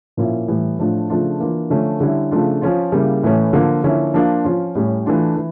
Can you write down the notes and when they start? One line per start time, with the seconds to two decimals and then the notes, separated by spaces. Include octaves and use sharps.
0.17 A#2 F3 A#3 C#4 E4
0.48 A2 E3 G3
0.79 A2 F3 A3 D4
1.09 C#3 F3 A3 D4 F4
1.40 E3 A#3 D4 F4
1.70 D3 F3 A3 C#4
2.00 D3 G3 C#4 E4
2.31 C#3 F3 A3 D4 F4
2.61 F3 C#4 F4
2.92 C#3 G3 A#3 E4
3.23 A2 E3 A3 C#4
3.53 D3 F3 A#3
3.84 D3 F3 A#3 C#4 E4
4.14 F3 A#3 D4 F4
4.44 F3 C#4 F4
4.75 A2 G3 C#4
5.06 E3 A3 D4 F4
5.36 E3